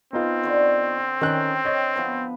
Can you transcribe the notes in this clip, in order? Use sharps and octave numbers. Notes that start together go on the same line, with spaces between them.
B3 C4 D#4 F4
D3 C#5
D#3 C#4 E5 G5 F#6
C#5 D#5
F3 B3 B4